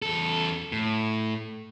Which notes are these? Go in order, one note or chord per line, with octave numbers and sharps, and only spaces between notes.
E2 A4
A2